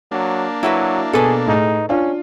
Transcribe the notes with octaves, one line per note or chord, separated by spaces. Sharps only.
F#3 A#3 D4
F#3 E4 F#4 B4
B2 G#4 A4 B4
A2 D#4 G#4
C#4 D4 F4